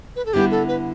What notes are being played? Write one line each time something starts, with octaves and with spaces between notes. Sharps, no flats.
B4
A4
D3 G3 B3 E4 G4
A4
B4